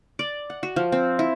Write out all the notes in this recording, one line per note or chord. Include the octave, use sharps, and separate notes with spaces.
D5
F#5
F#4
F3
C4
E4